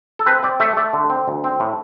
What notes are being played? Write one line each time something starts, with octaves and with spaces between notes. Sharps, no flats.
A4
C4 B4
C4 D5
A3 E5
A3 D5
D3
C4
D2
C4
A2